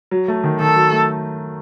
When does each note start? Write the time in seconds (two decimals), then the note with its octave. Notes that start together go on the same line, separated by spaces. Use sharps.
0.11 F#3
0.28 A3
0.44 D#3
0.60 D#3 A4
0.76 F#3
0.92 A3